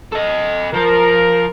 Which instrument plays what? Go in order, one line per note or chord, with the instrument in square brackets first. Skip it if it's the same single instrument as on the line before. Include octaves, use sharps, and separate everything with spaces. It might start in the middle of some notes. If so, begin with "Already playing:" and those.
[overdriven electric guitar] A4 D#5
[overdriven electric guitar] F3 [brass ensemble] A#4